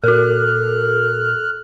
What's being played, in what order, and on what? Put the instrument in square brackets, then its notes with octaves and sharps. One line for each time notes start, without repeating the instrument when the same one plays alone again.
[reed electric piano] A#2 [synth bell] F#4 A#4 [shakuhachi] A4 [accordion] F6 F#6